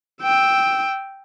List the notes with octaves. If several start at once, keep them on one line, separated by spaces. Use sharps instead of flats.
G5 E6